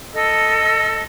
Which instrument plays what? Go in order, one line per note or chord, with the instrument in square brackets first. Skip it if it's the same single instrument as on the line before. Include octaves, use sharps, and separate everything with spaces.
[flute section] A4 D#5 E6